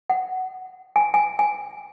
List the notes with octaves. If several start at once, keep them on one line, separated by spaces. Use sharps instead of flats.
F#5
G#5
G#5
G#5